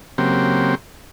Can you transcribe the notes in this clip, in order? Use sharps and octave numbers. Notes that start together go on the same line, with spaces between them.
C#3 F#3 A#3 C4 G4